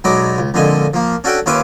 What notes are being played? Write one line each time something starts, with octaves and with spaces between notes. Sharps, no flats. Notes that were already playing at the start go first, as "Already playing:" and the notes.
B1 F#3 G#3 D5 A#5 B5
C#2
A#1 F2 D3 G#3 D#5 G#5
F3 A#3
C#4 D4 F#4 A4 F#5 G5
D#2 C#4 F4 B4 E5 D6